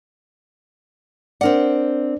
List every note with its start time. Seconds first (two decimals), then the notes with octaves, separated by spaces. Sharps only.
1.41 C4 D4 A#4 D5 F#5